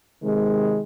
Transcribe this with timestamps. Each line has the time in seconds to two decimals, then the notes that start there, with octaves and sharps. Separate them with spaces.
0.23 C3 D#3 G#3